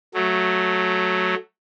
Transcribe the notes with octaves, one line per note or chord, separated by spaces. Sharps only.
F#3 A3